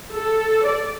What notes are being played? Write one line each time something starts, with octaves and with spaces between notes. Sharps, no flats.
A4
D5